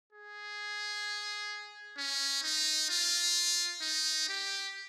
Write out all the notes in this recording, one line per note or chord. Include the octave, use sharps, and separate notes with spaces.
G#4
C#4
D#4
F4
D#4
G4